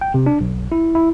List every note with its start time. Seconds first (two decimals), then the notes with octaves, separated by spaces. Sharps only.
0.01 G5
0.14 C3
0.26 D4
0.40 B1
0.72 E4
0.95 E4